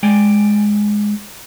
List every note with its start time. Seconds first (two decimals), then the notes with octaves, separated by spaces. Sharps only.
0.03 G#3 D5 G5 G#5